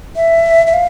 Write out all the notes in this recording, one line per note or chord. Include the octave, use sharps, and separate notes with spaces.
E5
E5
F5